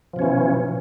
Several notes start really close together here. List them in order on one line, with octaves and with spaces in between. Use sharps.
F3 B2 C#4 E3